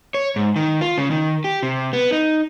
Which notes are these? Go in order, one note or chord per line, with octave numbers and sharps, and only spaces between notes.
C#5
G#2
D#3
F4
C#3
D#3
G4
C3
B3
D#4